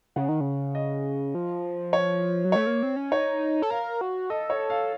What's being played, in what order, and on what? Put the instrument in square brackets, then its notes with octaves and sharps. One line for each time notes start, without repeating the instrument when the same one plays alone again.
[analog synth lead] C#3 [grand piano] F#5
[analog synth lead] D#3
C#3
[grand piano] D#5
[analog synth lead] F3
[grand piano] C#5
[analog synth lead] F#3
[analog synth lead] A3 [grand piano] C#5
[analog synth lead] A#3
C4
C#4
[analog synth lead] D#4 [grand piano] C#5
[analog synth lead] A4
[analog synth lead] A#4 [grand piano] F5
[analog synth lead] F#4
[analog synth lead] A4 [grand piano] D#5
[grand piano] C#5
F5